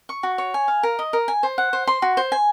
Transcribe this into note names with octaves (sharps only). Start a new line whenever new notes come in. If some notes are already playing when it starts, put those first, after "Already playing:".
C#6
F#4
C#5
G#5
F5
A#4
D#5
A#4
G#5
C5
F#5
C5
C6
F#4
C5
G#5